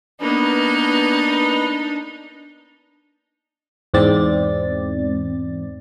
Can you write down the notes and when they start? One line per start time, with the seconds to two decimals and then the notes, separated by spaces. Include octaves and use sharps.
0.21 A#3 B3 D4 D#4 B4 D#5
3.94 E2 G#2 C4 D5 A6